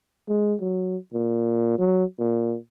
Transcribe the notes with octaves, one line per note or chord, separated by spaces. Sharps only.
G#3
F#3
A#2
F#3
A#2